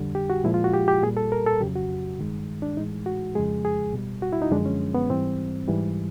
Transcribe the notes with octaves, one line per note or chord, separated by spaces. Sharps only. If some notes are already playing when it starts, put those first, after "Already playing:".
Already playing: F2 D3 G3
G4
F#4
A#2 F3 G#3 E4
F4
F#4
G4
G4
A#2 G3 G#4
A4
A#4
A4
F2 C#3 F#3 G4
F#4
G2 D#3 G#3
D4
A2 E3 G#3 D#4
F#4
F2 C#3 F3 G#3 G#4
G#4
B2 G3
F#4
E4
D#4
F#2 D3 F3 G#3 D4
C#4
B3
G#2 E3 G3 C4
G#2 E3 G3